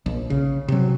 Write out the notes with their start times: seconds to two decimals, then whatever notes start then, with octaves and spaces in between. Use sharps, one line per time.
0.06 A#1
0.30 C#3
0.68 C3 F#3